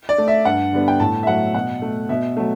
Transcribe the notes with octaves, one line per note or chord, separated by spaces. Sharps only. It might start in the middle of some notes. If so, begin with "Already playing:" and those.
D5
A3
E5
G2 F#5
D3 G3 B3
G5
A2 A5
E5
F#3 A3 F#5
B2 F#5
A3
B2 E5
F#3 A3